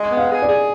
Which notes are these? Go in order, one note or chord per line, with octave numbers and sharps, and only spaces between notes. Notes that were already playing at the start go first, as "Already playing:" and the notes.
Already playing: G#3 D#5
B3
F5
G#4
D5
G#4